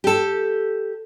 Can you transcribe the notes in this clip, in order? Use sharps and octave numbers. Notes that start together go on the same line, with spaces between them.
G4 A4